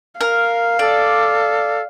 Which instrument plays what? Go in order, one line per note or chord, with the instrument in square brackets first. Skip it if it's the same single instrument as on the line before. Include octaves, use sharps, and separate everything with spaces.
[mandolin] A#4 [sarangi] F5
[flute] A4 [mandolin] D5